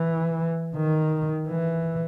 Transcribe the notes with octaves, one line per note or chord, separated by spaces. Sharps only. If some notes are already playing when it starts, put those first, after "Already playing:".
Already playing: E3
D#3
E3